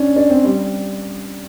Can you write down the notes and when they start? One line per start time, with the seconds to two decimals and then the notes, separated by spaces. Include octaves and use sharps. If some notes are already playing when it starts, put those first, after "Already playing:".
Already playing: C#4 D4
0.16 D4
0.30 C4
0.45 G3